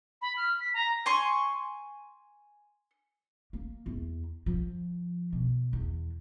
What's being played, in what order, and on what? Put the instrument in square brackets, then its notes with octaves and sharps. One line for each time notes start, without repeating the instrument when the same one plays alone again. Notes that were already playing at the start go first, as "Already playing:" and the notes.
[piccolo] B5
F6
B6
A#5
[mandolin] G#5 C6 C#6
[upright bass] A#3
E2
F3
B2
E2